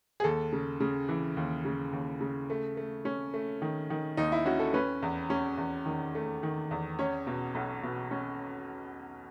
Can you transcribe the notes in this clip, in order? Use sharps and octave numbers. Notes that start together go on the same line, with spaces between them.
G#4
D#2 A4
C#3
C#3
E3
D#2
C#3
D#2
C#3
A3
A3
C#4
A3
D#3
D#3
D#2 D#4
E4
C#4 F#4
A4
C#4 B4
E2
C#4
E2
D#3
A3
D#3
E2
C#4 C#5
B2
B1
B2
C#4